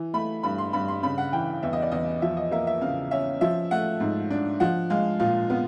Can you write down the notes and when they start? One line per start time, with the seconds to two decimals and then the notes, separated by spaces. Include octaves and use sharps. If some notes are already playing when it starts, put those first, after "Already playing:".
Already playing: E3
0.14 A3 B5
0.43 G2 B5
0.58 C6
0.73 G2 B5
0.88 C6
1.03 C#3 B5
1.18 F#5
1.33 E3 G5
1.63 E2 E5
1.73 D#5
1.82 D5
1.91 E2 D#5
2.22 F3 E5
2.37 D#5
2.51 A#3 E5
2.67 E5
2.81 C#3 F5
3.11 C#4 E5
3.41 F3 E5
3.71 A3 F#5
4.00 G#2
4.30 D4
4.60 F3 F#5
4.90 G#3 F5
5.20 A#2 F5
5.50 B3 F5